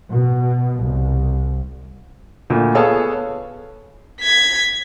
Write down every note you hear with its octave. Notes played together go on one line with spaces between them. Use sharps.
B2
C2
D2 A#2
B3 G#4 A4 C#5 F5 A5
G#6 B6